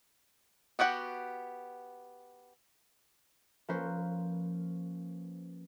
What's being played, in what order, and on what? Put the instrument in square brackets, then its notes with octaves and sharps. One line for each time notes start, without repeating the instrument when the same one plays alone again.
[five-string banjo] B3 F#4 G4 F#5
[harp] F3 A#3 C#4 B4 C5